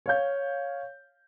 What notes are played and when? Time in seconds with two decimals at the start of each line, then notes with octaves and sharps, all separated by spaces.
0.06 C#5 F5 G6